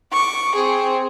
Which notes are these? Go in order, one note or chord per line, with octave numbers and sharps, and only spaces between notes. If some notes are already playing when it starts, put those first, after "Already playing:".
C#6 D6
C4 G#4